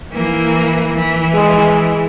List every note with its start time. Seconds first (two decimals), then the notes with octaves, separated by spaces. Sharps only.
0.13 E3 A#3
0.95 E3
1.34 G#3